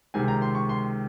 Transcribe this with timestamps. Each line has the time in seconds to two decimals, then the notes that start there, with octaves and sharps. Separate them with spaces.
0.14 C#2 C3 D#3 G#5
0.28 A#5
0.42 C6
0.55 C#6
0.69 C6